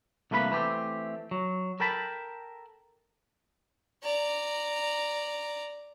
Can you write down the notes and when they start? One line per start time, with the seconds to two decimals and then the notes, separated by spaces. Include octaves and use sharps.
0.31 C2 A3 A#3 B4 F5 B5
0.51 E3 A3 C4 G4
1.31 F#3
1.80 A4 A#4 G5 A5 B5
4.03 D5 A#5